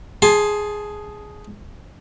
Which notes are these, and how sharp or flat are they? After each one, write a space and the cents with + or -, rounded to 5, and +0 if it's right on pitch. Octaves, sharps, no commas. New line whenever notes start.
G#4 +0 A5 -20 C6 +10